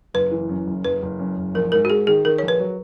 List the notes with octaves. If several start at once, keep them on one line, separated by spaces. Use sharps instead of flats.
F#1 B4
E3
F#2
F#1
F#1 B4
F#1
F#2
F#1
A#1 A#4
G#2 A#4
F#4
G#2 G#4
D#3 G#4
D#3 A#4
A#1 C#5
B4
F#3